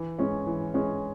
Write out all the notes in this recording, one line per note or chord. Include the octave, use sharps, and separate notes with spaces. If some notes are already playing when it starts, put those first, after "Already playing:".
Already playing: E3
G#3 C#4
E3
G#3 C#4